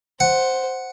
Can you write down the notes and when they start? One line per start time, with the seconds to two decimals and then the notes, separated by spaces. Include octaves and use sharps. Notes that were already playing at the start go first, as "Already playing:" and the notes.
0.20 C5 F#5